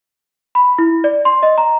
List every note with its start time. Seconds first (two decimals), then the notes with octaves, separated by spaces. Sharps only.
0.55 B5
0.78 E4
1.04 D5
1.25 C6
1.43 D#5
1.58 A#5